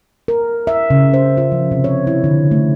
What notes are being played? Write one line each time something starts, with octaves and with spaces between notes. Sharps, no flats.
A#4
E5
C#3
C5
F4
F3
C3
C#5
E4
D3
A3